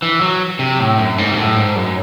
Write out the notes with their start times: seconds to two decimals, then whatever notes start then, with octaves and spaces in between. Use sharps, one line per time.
0.02 E3
0.21 F#3
0.59 C3
0.79 A2
0.98 F#2
1.18 G#2
1.31 C3
1.37 A2
1.56 G#2
1.76 F#2